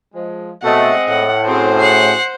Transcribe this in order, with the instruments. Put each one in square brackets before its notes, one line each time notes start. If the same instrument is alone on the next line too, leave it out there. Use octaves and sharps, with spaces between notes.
[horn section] F3 G#3
[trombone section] B2 A3 [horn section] G#3 C4 D#5 [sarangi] F#5
[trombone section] A2 [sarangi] F#5
[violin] C4 [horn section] C#4 F#4 G#4 [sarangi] C5
[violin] F#5 C7